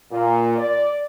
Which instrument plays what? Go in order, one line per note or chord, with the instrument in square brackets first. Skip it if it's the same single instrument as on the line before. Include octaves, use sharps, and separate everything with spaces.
[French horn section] A#2
D5